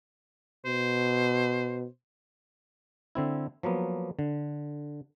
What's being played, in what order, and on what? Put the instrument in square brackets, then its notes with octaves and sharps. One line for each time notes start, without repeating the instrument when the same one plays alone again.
[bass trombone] B2 [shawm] C5
[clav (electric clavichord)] D3 C4 E4
F3 F#3 A#3 B3
D3